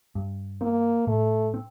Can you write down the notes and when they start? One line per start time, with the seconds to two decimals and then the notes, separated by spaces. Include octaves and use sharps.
0.15 G2
0.61 A#3 C4
1.07 A2 A3
1.54 C4